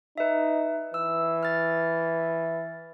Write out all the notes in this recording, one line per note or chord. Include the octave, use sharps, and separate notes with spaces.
D#4 B4 E5
E3 E6
F6 A6